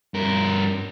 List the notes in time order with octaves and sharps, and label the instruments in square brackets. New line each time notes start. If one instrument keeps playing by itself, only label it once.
[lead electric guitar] G2 A#4